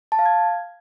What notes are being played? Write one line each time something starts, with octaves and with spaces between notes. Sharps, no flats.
A5
F5
G#6